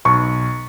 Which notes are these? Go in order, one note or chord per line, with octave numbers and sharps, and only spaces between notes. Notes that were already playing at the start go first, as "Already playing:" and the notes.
B1 C#6